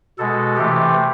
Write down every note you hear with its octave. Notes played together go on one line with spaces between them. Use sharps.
B2 G#3 A4
C3 E3 A3 G4